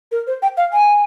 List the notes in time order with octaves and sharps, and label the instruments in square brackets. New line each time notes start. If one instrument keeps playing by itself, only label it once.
[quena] A#4
C5
G5
F5
G#5